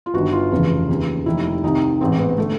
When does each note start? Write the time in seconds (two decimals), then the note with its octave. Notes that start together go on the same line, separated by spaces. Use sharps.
0.06 F4
0.14 G1 G2 D#3 F#4
0.33 F4
0.52 F1 E2 C#3 E3
0.89 D#2 C#3 E3
1.26 F1 D#2 D#3 E4
1.63 C2 C3 D#3 D#4
2.01 A1 G#2 E3 C4
2.19 B3
2.38 D3 A3